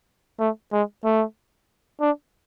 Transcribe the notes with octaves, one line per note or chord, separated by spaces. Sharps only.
A3
G#3
A3
D4